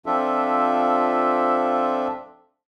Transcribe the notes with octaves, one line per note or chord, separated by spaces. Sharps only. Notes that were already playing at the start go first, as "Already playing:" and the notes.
F3 C4 D4 F4 A4 E5